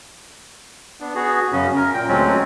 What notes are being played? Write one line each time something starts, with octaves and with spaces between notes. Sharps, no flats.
B3 D4
B3 F#4 G#4
F#2 C#3 C#4
A#4
A#2 G5
D2 F#3 G#3 C4 C#4